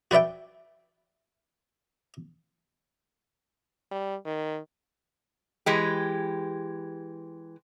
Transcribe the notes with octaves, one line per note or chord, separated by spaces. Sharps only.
F#4 B4 D5 E5 G5
G3
D#3
E3 G#3 G4